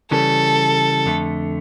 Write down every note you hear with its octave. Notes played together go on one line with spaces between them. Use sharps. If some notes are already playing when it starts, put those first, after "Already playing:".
C#3 E3 G3 A4
F2 D3 A3